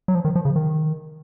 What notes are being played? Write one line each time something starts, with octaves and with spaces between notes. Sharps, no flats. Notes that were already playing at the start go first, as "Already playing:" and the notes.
F#3
F3
D#3
F3
C#3
D#3